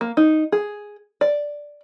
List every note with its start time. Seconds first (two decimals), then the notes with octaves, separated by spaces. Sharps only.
0.01 A#3
0.17 D#4
0.52 G#4
1.21 D5